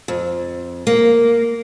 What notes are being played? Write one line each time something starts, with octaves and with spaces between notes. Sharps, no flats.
F2
A#3